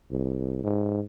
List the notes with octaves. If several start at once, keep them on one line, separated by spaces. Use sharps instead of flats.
C2
G#2